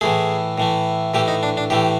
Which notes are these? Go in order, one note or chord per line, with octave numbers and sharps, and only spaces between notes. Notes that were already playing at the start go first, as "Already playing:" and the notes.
A2 E3 A3 G#4
A2 E3 A3
A2 E3 A3 G4
D#4
D4
D4
A2 E3 A3 G4